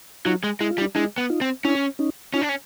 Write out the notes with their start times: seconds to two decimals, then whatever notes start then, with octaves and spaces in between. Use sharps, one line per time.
0.25 F#3 D#4 F4
0.44 G#3
0.61 G#3 E4
0.71 F4
0.78 G3
0.81 D4 E4
0.95 G#3 D4 E4
1.18 B3
1.30 D#4 F4
1.41 C4
1.65 C#4 D4 E4
1.99 C#4 D#4
2.34 C#4 D#4 F4
2.42 D4
2.49 C#4